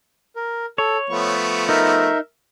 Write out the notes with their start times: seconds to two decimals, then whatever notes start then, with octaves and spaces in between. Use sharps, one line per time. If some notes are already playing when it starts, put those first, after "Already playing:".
0.36 A#4
0.78 A4 C#5
1.10 F3 A3 B3 C#6
1.69 D#4 A#4 E5